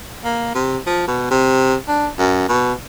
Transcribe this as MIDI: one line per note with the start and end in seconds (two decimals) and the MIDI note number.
0.24 0.50 58
0.55 0.77 48
0.86 1.07 53
1.08 1.28 47
1.31 1.75 48
1.88 2.07 62
2.18 2.46 42
2.49 2.73 47